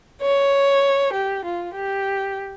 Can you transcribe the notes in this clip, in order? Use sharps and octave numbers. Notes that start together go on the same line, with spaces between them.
C#5
G4
F4
G4